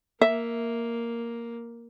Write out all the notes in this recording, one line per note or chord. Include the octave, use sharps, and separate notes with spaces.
A#3 E5